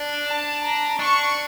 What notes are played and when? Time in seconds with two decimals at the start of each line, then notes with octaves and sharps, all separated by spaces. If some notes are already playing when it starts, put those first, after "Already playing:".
Already playing: D4
0.26 A5
0.63 A#5
0.99 D4 C#6